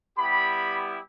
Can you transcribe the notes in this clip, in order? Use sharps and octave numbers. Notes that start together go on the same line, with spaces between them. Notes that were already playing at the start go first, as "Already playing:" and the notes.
G3 B3 E4 G4 B5